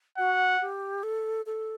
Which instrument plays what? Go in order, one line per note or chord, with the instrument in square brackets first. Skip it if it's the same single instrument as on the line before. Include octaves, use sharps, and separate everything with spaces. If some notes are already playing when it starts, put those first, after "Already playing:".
[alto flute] F#4 [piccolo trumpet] F#5
[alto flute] G4
A4
A4